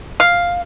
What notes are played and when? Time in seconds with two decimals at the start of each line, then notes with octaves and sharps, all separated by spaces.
0.20 F5